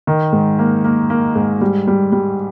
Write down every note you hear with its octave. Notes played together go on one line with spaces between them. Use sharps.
D#3
G#2
A#3
A#3
A#3
G#2
G3
G3
G3